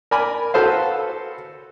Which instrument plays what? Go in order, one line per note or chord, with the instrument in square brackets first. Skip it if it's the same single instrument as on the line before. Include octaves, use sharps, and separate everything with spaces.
[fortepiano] A#4 D5 G#5 B5
F#4 A4 B4 C5 F5